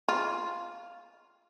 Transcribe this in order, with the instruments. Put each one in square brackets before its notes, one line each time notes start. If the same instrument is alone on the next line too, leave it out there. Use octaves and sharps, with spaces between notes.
[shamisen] F4